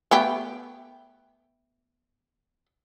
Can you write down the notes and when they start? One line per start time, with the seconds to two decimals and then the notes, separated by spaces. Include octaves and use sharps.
0.11 A3 B3 G4